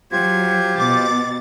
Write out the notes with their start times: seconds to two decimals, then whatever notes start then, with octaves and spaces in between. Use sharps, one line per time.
0.12 F#3 F4 G4 C5 G#6
0.79 B2 D6 A6